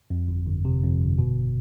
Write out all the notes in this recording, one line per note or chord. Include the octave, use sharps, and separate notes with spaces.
F2
G1
G1
C3
F2
G1
B2